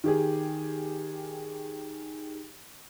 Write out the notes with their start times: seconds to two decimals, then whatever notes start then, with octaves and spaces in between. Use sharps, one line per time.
0.04 D#3 G4 G#4